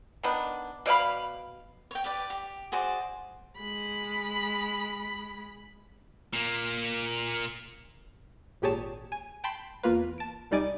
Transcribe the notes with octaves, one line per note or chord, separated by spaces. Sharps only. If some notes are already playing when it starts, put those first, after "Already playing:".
D#3 B3 D4
B2 D5 F5 B5
C#5 G5
G4 B4 D5
G4
F#4 G#4 C5 D5
G#3 B5
A#2 A#3
G#1 A#2 G4 G#4 C#5 A5
G#5
G5 A5 B5 C6 G6
E2 A#3 F4 B4
A5 D7
C2 G3 D#4 D5 G#5 D6